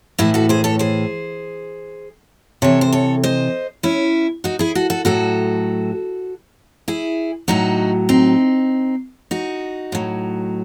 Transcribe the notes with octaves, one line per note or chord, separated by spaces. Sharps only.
A2 E3 E4 G#4
F#4 A4
G#4 C5
A4 C#5
G#4 C5
C3 E3 A4 C#5
C5
A4 C#5
C5 D#5
C#4 E4
D#4 F#4
E4 G#4
F#4 A4
F#4 A4
A2 F#3 F#4 A4
E4 G#4
A2 F#3 D#4 F#4
C4 D#4
D#4 F#4
A2 F#3